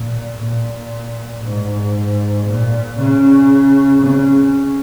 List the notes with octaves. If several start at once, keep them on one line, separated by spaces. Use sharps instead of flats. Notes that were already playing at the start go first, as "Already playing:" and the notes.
Already playing: A#2
A#2
G#2
A#2
C#3
C#3